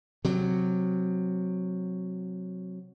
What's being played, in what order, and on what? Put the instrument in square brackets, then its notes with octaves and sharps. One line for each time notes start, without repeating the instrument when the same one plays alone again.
[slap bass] C3 F#3